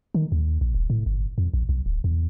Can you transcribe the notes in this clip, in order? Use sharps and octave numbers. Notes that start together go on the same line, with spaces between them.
D#3
D#2
A#1
D#1
A2
G1
F2
A#1
B1
D1
E2